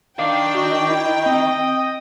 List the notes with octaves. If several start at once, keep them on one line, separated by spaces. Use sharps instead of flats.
D#3 D4 F5 G5
F#4
E4
C4 D#5